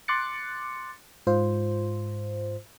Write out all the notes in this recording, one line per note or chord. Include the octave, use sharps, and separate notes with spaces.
C6 D6 F#6 A6 C#7
G#2 F4 C5